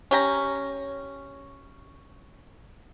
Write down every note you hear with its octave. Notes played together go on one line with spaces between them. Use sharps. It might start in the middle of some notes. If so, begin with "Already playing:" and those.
C#4 G4 A#5